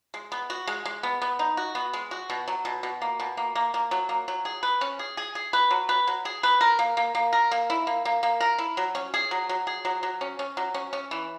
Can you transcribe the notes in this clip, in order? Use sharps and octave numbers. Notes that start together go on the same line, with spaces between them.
G#3
B3
F#4
G#3
G#3
B3
B3
D#4
F#4
B3
G#3
F#4
B2
F#3
B2
B2
A#3
B2
A#3
A#3
A#3
F#3
A#3
F#3
G#4
B4
C#4
G#4
G#4
G#4
B4
F#3
B4
F#3
G#4
B4
A#4
A#3
A#3
A#3
A#4
A#3
E4
A#3
A#3
A#3
A#4
E4
F#3
C#4
G#4
F#3
F#3
G#4
F#3
F#3
C#4
C#4
F#3
C#4
C#4
E3